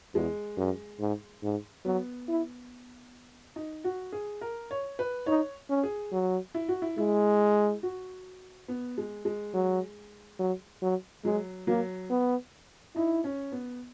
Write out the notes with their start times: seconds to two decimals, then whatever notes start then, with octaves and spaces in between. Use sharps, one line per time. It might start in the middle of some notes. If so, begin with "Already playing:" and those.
0.14 E2 G#3
0.57 F#2
1.00 G#2
1.43 G#2
1.85 F#3 B3
2.28 E4
3.56 D#4
3.84 F#4
4.12 G#4
4.41 A#4
4.71 C#5
4.99 B4
5.26 D#4 C#5
5.70 C#4
5.84 G#4
6.12 F#3
6.54 E4
6.69 F#4
6.82 E4
6.98 G#3 E4
7.83 F#4
8.68 B3
8.98 G#3
9.25 G#3
9.54 F#3
10.39 F#3
10.82 F#3
11.25 F#3 G#3
11.67 F#3 A#3
12.10 B3
12.96 D#4 E4
13.24 C#4
13.52 B3